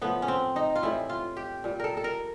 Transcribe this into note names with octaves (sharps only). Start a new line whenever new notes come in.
A2 F3 B3
C#4
C4
D#4
F4
A2 E3 G3 E4
F4
G4
A#2 G3
A4 A#4
A4
A#4